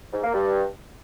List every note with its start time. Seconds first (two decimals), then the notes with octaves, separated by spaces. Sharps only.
0.13 G#2
0.24 A#3
0.34 G2